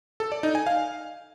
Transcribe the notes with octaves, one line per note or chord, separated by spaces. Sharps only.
A4
D5
D#4
G#5
F5